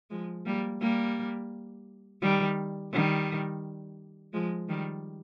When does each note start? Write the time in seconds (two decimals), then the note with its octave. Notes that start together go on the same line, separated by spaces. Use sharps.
0.10 F3 G#3
0.46 G3 A#3
0.81 G3 A#3
2.22 D#3 G3
2.93 D#3 G3
4.33 F3 G#3
4.69 D#3 G3